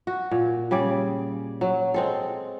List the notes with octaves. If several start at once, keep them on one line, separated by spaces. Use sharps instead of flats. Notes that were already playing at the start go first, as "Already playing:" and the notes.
F#4
A#2
C#3 G3 G#4 D5
F#3
G#3 C4 A4